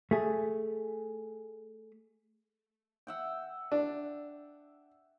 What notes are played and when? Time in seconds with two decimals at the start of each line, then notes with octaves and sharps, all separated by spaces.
0.11 A3 G#4
3.07 E5 F#5 G5
3.72 D4